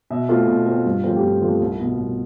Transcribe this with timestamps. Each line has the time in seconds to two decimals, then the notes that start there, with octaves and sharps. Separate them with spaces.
0.10 B2 E5
0.29 A3 C4 F4
0.47 B2
0.67 A3 C4
0.85 G2
1.04 F3 A3 C4
1.16 G4
1.23 G2 F4
1.41 F3 A3 C4
1.60 C2
1.79 B2 B3
1.98 C2